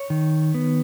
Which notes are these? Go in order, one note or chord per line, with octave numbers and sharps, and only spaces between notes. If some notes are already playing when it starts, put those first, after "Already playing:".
Already playing: C#5
D#3
B3